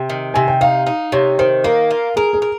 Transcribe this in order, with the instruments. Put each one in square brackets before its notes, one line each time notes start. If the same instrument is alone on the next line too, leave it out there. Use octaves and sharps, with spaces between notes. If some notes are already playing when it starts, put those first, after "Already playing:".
Already playing: [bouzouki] C3 [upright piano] G5
[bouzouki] D#3
[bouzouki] C3 [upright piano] G#5
[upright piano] G5
[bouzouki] D#4 [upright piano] F5
[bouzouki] D#4
[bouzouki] C3 [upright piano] C#5
[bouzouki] D#3 [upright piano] C5
[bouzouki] A#3 [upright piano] A#4
[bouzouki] F4
[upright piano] G#4 [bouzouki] A#4
[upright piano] G#4
[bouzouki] A#4